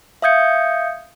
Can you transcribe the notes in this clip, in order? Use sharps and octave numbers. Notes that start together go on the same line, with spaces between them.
E5 F5 D#6 G6 G#6 C#7